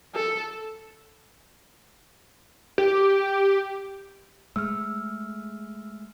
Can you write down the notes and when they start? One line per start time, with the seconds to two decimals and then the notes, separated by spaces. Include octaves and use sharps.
0.15 A4
2.78 G4
4.56 G#3 A3 E6 F6